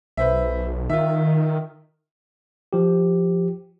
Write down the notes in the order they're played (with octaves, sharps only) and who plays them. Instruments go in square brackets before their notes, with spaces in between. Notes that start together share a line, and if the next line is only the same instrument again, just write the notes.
[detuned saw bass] B1 [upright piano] B4 C5 E5
[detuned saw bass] D#3 [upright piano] F4 E5
[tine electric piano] F3 G4